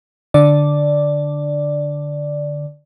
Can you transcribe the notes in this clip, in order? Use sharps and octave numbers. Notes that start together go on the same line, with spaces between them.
D3 D5